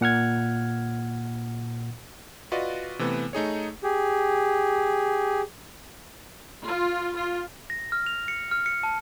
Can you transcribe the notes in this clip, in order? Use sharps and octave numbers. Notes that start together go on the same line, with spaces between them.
A#2 F#5 F6 G#6
F4 F#4 B4 D5 D#5
C3 E3 A3 B3
A3 D#4 G#4 C#5
G4 G#4
F4
F4
A#6
F6
F7
C#7
F6
C#7
A5